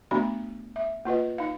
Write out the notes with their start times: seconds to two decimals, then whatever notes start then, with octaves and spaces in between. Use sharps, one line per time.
0.11 A3 B3 D4 F#4 B5
0.76 E5
1.05 A#3 F4 B4 D#5
1.38 D#4 F5